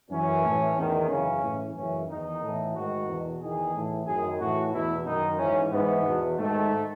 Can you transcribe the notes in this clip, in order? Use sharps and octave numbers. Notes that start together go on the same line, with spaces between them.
F#2 E3 C#4
A2 E3
E2 D#3
F#2 C#3 E3 C#4
A2 E3
F#2 C#3 E3 C#4
E2 D#3 D#4
A2 E3
G#2 D#3 F#4
E2 B2
E2 D#3 G#4
A2 E3
F#2 D#3 G#4
A2 E3 F#4
E2 B2 E4
F#2 D#3 D#4
G#2 E3 C#4
G#2 E3 B3
E2 B2
G#2 D#3 A3